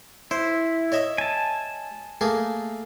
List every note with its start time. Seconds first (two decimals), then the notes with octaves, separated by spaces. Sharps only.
0.31 E4 C5
0.92 C#5 D#5 E5
1.18 G#5 A5
2.21 A3 A#3 G#4